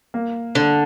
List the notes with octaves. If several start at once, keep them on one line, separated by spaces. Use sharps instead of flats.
A#3
D3 D4